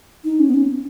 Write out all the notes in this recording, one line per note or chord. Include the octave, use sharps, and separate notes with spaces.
D#4
C#4
B3
C#4